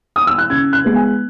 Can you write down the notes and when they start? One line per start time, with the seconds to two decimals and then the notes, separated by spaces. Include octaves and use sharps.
0.16 D#6
0.27 E6
0.38 F#6
0.50 C#3 G#6
0.73 F#6
0.85 G#3 B3
0.96 G#5